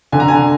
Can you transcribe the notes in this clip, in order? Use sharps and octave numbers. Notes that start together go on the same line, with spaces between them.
D3 G#5
A#5
D3 G#5